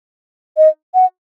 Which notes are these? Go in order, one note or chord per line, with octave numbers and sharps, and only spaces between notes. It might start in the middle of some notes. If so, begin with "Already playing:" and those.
D#5
F#5